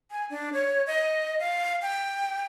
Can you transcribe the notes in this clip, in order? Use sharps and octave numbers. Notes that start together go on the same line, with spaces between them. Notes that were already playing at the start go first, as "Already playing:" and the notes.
G#5
D4
C#5
D#5
F5
G5